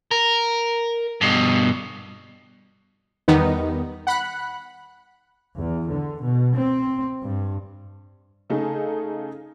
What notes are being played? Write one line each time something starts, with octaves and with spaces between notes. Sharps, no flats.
A#4
G2 B2
E2 D#3 G3 B3 D#4
F#5 B5 F#6
E2
D3
B2
C4
G2
C#3 A3 D#4 G#4 A4